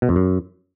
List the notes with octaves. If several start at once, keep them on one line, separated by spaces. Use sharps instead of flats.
B2
F2
F#2